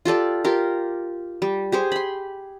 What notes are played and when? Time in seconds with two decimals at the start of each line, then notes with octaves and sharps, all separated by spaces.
0.05 F4 G4 A4 D5
0.44 F4 G4 A#4
1.42 G3
1.72 G4 G#4 C5
1.92 B5 C6